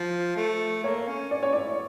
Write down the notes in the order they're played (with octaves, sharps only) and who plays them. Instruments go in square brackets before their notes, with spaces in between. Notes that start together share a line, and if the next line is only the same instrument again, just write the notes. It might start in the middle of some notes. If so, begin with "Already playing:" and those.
Already playing: [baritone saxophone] F3
A3
[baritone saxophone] A#3 [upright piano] C#5
[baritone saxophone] C#4
[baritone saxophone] C#4 [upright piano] D5
[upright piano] C#5
[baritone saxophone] E4 [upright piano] D5